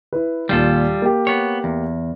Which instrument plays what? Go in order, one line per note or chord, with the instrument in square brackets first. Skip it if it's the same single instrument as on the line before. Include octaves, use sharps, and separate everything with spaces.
[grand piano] E4 B4
[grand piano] D#2 A#2 [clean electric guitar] G3 F4 A4
[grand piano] A#3 G4
[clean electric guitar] B3 C#5
E2